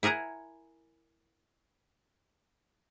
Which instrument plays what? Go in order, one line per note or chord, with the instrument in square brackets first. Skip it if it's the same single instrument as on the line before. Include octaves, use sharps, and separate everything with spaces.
[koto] E4 G#4 A#4 F#5 A#5